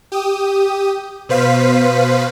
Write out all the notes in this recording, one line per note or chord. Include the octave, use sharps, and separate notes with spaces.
G4 D#6
B2 B4 C5 F5 B6